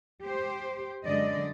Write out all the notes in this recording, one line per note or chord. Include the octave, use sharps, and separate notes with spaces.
G4 C5
F#2 D3 F#3 G#3 D5 D#5